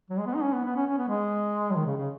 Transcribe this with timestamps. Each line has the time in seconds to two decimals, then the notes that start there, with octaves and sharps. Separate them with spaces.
0.10 F#3
0.18 G#3
0.26 B3
0.35 D#4
0.43 C#4
0.53 B3
0.65 B3
0.76 C#4
0.87 C#4
0.98 B3
1.09 G#3
1.71 F#3
1.75 D#3
1.86 C#3
1.97 C#3